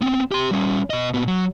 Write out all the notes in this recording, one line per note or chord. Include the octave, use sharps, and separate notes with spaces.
B3 C4
G4 C6
G3 C#4
B2 D#5
A#2 B3
F#3